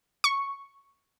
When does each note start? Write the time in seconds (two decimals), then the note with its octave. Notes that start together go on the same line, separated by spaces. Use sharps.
0.24 C#6